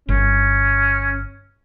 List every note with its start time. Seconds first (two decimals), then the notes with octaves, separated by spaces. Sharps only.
0.09 G1 C#4